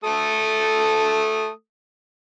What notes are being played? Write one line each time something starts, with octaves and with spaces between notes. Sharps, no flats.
A3 A4 D#6